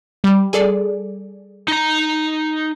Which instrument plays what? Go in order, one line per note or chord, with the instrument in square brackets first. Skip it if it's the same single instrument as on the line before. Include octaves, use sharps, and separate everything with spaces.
[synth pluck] G3
G#4 A4 D5
[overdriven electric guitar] D#4 A#5